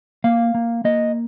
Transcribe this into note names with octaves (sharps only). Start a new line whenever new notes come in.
A#3 F5
A#3
A#3 D#5